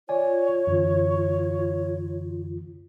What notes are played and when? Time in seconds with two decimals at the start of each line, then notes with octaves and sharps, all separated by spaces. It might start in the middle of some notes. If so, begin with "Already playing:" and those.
0.09 F4 C#5 D5 G#5
0.67 F#2 D3 E3